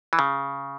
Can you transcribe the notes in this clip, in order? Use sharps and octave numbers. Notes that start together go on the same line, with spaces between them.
E3
C#3